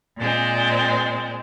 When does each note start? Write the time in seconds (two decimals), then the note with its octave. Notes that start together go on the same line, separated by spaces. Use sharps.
0.18 A#2 G#3 C4